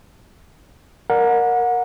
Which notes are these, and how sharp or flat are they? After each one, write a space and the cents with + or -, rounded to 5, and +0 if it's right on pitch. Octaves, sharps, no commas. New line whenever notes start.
A#4 +0 D5 +0 F#5 -30